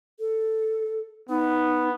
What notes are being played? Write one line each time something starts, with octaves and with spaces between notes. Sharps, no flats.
A4
B3 D#4